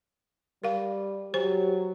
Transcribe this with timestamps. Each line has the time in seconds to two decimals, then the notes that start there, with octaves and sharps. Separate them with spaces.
0.64 G3 A#4 F5
1.34 F#3 G4 C5